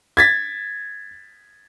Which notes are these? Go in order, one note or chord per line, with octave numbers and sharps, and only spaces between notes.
G#6 A6 B6